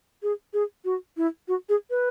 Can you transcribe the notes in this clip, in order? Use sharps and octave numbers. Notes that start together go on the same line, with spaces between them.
G#4
G#4
F#4
E4
F#4
G#4
B4